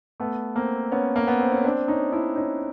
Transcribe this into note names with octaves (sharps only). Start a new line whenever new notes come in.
A3 B3
A#3 C4
B3 C#4
A#3
B3
C4
C#4
C4 D4
C#4 D#4
D4 E4
C#4 D#4